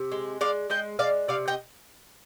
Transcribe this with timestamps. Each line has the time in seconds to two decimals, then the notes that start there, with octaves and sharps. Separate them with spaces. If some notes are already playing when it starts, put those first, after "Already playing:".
Already playing: C3
0.12 G#3
0.41 G#3 D5 F5
0.70 G#3 D#5 G5
0.99 G#3 D5 F5
1.28 C3 D5 F5
1.48 D#5 G5